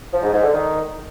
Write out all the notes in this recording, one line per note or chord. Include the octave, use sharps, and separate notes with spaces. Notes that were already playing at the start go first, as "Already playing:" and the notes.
F3
G#2
G#2
D3
D#3